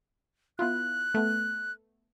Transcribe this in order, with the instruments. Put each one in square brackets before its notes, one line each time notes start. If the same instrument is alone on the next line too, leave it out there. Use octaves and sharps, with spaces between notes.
[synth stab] B3 E4 F4 [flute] F#6
[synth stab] A3 B3